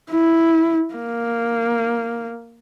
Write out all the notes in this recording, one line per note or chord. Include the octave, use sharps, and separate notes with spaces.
E4
A#3